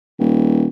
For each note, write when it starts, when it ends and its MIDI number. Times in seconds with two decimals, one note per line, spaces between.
0.19 0.67 27